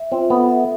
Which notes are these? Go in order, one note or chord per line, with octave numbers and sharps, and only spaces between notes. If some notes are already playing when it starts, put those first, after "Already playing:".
Already playing: E5
C4 F4
B3 A4
E5